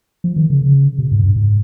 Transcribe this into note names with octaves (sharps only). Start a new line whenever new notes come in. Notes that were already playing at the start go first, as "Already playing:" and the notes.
F3
D#3
C#3
C#3
B2
G#2
G2
G#2